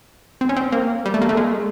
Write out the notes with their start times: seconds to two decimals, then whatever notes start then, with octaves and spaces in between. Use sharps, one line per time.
0.41 C4
0.49 C#4
0.56 C4
0.72 A#3
1.05 G3
1.14 A3
1.22 A#3
1.29 A3
1.37 G#3